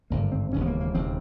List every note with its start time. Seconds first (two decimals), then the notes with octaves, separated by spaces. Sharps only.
0.10 G#1 G2 D3 A#3
0.32 C4
0.52 E1 D#2 C#3 C#4
0.61 B3
0.66 A#3
0.80 A#3
0.94 E1 D#2 C#3 C4